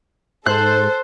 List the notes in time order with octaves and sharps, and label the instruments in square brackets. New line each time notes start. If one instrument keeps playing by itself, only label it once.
[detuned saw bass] G#2 [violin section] A4 C5 [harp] F#6